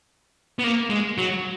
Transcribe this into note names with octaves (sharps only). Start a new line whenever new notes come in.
B3
A#3
G#3
F#3